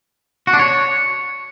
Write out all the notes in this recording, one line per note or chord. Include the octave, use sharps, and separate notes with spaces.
F#4
D4
C#5